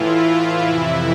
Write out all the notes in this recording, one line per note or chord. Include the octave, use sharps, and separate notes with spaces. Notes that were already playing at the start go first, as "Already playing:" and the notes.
Already playing: A2 E3 E4 F4
F4
F2 C3 E3 E4